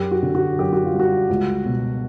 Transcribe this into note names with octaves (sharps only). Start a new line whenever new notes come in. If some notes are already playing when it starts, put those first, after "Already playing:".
Already playing: F#2 G4
F#4
D3
F#4
F#2 G4
F#4
F4
G3
F#4
C#2
B2